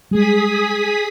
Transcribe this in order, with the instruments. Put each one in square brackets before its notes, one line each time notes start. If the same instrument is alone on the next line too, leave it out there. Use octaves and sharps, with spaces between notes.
[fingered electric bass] G3 G#3 [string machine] G#4 D#6 B6